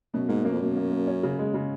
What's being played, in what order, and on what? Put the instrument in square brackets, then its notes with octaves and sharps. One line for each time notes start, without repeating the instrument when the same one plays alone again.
[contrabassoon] F#2 [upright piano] B2
[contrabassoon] G#2 [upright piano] A#3
[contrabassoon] F#2 [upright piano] A#3
[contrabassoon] F2
[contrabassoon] F#2 [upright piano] B2
[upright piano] A#3
A#3
C#4
C#3
G#3
C#3